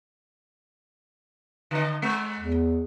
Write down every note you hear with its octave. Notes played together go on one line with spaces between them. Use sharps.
D3 D#5
G#3
E2